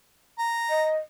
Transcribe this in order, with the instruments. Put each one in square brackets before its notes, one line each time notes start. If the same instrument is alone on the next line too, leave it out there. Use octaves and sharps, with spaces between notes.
[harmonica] A#5
[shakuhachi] D#5